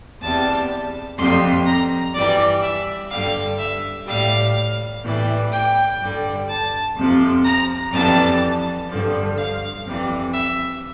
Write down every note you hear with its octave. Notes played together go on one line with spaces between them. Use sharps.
E2 C3 G3 A5
F2 C3 G3 C6
A#5
G2 E3 G3 D5
E5
G2 D3 G3 F5
E5
A2 G3 F5
A2 E3 G3
G5
G2 D3 G3
A5
F2 C3 F3
A#5
F2 E3 G3 A5
G2 D3 F3
F5
F2 C3 E3 G3
E5